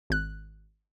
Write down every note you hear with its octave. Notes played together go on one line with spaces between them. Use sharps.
G#1 F#6